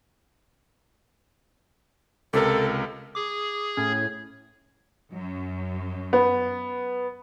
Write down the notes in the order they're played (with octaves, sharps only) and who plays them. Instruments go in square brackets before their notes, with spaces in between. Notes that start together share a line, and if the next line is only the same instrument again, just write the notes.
[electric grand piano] C#2 C3 A#4 [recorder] A4
[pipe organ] G#4 [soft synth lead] D6
[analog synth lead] A2 [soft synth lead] C#4 [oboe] G#5
[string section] F#2
[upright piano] B3